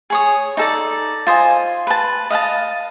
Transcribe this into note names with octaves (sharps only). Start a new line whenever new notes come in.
G#4 C#5 D#6
D#4 A4 D5
F4 C5 D#5 G#5
B4 A5
D#5 F5 F#5 A5